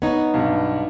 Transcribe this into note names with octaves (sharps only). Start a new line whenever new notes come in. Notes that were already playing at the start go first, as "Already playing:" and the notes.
B3 D#4 C#5
B1 G2